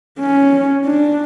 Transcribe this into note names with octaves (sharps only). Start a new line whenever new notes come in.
C#4
D4